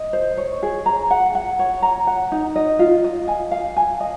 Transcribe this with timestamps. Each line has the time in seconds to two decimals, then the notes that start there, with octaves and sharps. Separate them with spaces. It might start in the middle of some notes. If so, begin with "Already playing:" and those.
Already playing: D#5
0.13 C5
0.37 C#5
0.63 G#4
0.86 A#5
1.11 F#5
1.35 F#5
1.59 C#5
1.82 A#5
2.07 F#5
2.32 D#4
2.56 D#5
2.79 F4
3.04 D#5
3.28 G#5
3.51 F5
3.77 G#5
4.00 D#5